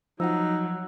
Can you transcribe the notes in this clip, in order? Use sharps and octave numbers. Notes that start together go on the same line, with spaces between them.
F3 F#3 D#4 F#5 E6